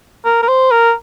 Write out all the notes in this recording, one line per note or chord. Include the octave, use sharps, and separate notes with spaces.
A#4
A#4
C5
A#4